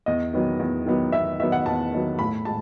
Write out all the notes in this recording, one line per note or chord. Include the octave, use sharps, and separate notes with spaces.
E2 D#5
D#3 F#3 B3
E2
D#3 F#3 B3
E2 E5
D#3 F#3 B3 E5
F#5
E2 A5
D#3 F#3 B3
A2 B5
G#3 A5